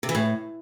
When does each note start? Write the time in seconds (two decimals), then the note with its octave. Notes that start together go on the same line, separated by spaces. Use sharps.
0.03 C3
0.09 E3
0.15 A2